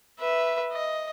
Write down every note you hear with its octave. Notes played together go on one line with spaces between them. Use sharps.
B4 E5
D#5